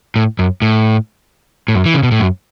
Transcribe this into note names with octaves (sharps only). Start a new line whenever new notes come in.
A2
F#2
A2
A2
F#2
E3
C#3
B2
A2
F#2